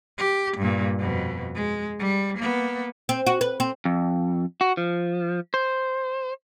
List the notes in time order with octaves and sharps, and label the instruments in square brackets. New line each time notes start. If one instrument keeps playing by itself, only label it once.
[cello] G4
G2 A#2
F2 B2
G#3
G3
A#3 B3
[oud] C4
F#4
B4
C4
[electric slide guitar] F2
F#4
F3
C5